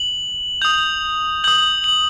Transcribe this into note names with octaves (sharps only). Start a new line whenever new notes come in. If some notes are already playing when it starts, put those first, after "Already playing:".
Already playing: F#7
D#6 G6 F7
D#6 G6 F#7
F#7